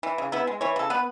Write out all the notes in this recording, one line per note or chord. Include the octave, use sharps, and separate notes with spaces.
E3
C#3
B3 E4
G#3
E3 C#5
C#3 A4
B3 B4